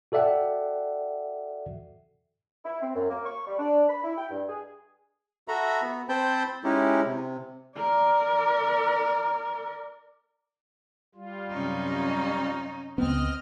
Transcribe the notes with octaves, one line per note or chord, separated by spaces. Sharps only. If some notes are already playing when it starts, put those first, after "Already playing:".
F#4 A4 D5 E5 F#5 G5
E4
C4
F#2
A#3
C#6
G3
D4
B5
E4
G5
G2
G#4
F#4 A4 E5 A#5 B5
B3
C4 C5 G5 A5 B5 G6
G#3 C#4 D#4 E4 G4
C3
A#4 D5
G3 F4
F#2 C3 C#4 D#4
C#2 B3 C4 D#5 F6